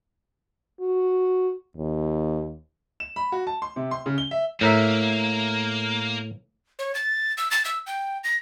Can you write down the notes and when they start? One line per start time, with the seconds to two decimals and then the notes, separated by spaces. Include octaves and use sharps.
0.80 F#4
1.77 D#2
3.00 E7
3.16 B5
3.32 F#4
3.47 A5
3.62 C6
3.76 C3
3.91 C6
4.06 C#3
4.18 G7
4.31 E5
4.61 A2 A#3 A#4 E5
6.79 C#5
6.95 A6
7.37 E6
7.51 A6
7.65 E6
7.87 G5
8.24 A#6